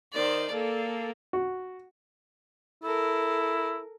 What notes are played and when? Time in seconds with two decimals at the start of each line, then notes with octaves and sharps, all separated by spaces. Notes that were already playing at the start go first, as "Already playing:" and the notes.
0.13 D#3 C5 D5
0.53 A#3 A4 D5
1.33 F#4
2.84 E4 A4 A#4